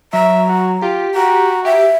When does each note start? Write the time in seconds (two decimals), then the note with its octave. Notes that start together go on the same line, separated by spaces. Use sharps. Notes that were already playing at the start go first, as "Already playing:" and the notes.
0.13 F#3 E5 A#5
0.48 F#4
0.82 F4 G4
1.15 F#4 A#5
1.65 G4 E5